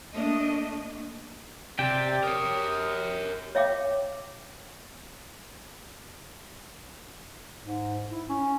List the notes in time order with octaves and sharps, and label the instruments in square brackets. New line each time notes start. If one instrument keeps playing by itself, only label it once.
[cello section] A3 A#3 D4 D#5
[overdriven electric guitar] C3 [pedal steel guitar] G4 G5 [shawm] D5
[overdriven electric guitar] A#4 C#5 [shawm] D#6
[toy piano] C#5 E5 F5 G5 D6
[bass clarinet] G#2
E4
C#4